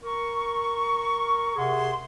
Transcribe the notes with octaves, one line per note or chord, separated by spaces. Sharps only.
A#4 C#6
C3 G#4 F#5 C6